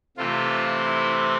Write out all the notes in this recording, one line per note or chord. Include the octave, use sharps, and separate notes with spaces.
C3 E3 A3 C4 F4
E4